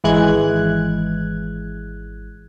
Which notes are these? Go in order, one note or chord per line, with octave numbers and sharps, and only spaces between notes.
G#1 E3 G#3 F#6 G#6